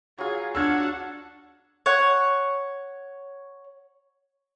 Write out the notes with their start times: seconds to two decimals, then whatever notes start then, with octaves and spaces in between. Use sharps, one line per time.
0.18 F#3 F4 G#4
0.55 D4 F#4 F#5 E6 F6 G#6
1.86 C#5 F#5